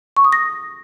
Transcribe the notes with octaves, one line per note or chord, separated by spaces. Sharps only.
C#6
D#6
A#6